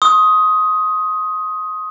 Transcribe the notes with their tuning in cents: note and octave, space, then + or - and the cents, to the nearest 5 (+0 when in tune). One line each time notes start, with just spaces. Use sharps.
C6 +40 D#6 +15